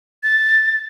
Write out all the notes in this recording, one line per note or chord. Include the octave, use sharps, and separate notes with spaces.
A6